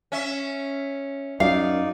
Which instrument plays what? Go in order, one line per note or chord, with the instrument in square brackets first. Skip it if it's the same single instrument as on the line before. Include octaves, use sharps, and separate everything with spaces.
[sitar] C#4 E5
[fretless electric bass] F#2 [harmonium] D#4 D5 [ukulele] F5